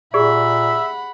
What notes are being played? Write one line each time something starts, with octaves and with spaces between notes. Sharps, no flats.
A#2 G4 G#4 D5 E5 F#5 B5